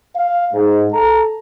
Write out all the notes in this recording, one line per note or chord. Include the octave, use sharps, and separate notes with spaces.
F5
G#2
A4 A5 A#5